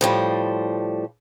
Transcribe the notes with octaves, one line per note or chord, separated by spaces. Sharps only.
A2 F3 G3